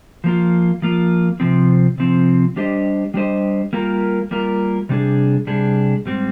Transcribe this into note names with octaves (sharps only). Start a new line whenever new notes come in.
F3 A#3 F4
F3 A#3 F4
C3 F3 C4
C3 F3 C4
G3 D4 G4 C5 D#5
G3 D4 G4 C5 D#5
G3 A#3 F4 A#4
G3 A#3 F4 A#4
C3 G3 D4 G#4
C3 G3 D4 G#4
G#2 G3 C4